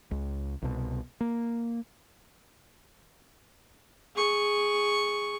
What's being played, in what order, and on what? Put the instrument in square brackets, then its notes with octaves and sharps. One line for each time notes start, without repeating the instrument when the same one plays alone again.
[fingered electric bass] C#2
C2 B2
A#3
[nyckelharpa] G#4 C#6